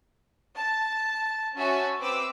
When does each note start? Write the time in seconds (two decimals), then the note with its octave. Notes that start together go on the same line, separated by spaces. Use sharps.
0.56 A5
1.55 C#4 F#4 E5 G#5 A5
2.00 C4 B4 D6 E6